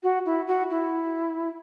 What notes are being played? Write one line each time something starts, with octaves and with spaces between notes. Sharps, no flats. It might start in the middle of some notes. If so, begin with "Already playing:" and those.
F#4
E4
F#4
E4